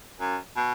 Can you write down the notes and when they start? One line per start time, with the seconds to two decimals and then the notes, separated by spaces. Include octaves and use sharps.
0.20 F#2
0.56 B2